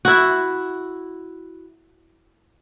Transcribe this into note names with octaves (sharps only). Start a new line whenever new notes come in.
E4 F#4